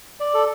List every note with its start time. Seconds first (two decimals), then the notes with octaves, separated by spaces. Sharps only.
0.20 D5
0.34 A4